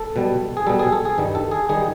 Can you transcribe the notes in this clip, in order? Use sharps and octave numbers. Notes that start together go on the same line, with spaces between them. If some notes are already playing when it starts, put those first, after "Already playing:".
Already playing: A4
B2 G3
G#4
B2 G3 A4
G#4
A4
G#4
G2 D#3 G3
A4
G#4
D#3 G3 G#4